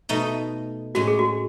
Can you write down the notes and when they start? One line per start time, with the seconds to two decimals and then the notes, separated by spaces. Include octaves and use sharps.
0.09 B2 A3 D#4
0.95 A2 G#3 C#4 F#4
1.08 G#4
1.19 F#4